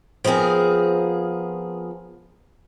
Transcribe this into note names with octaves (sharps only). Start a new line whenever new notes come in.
F3 B3 C4 G#4 A#4